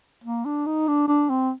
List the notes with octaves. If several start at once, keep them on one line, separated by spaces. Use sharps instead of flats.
A#3
D4
D#4
D4
D4
C4